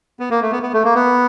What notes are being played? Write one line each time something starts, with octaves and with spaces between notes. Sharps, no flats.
B3
A#3
A3
B3
B3
A3
A#3
B3